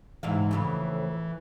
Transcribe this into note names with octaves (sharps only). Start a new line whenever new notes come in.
G#2 C3 E3 F5
F2 A2 C#3